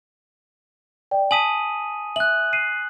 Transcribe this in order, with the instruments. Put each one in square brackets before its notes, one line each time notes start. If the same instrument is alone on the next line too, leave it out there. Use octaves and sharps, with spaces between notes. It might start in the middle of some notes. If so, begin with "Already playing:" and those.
[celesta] D5 G5
[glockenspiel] G#5 D#6 D#7 [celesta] A5 B6 F#7
[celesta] E5 [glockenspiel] F#6 F#7
[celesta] C7 D#7